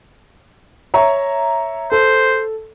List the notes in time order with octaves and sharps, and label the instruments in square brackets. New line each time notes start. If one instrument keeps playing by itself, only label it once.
[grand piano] C#5 E5 A#5
[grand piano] A4 [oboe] C5